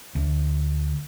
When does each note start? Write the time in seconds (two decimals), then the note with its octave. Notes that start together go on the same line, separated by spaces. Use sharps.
0.15 D2